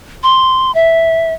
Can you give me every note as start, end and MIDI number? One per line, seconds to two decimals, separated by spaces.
0.23 0.71 84
0.75 1.34 76